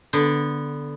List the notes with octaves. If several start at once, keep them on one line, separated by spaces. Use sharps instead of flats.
D3 B3